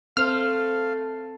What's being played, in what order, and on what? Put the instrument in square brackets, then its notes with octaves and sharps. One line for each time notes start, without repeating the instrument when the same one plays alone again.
[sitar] A3 [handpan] C4 C5 [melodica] F5 [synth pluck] F6